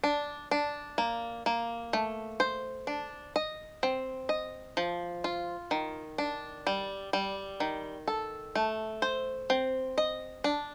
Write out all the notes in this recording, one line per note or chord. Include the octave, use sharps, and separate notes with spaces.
D4
D4
A#3
A#3
A3
C5
D4
D#5
C4
D#5
F3
F4
D#3
D4
G3
G3
D#3
A4
A3
C5
C4
D#5
D4